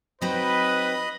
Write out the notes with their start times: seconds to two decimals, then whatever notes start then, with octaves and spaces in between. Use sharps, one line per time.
0.21 F#3 C4 D#4 B4 D#5 B5 D#6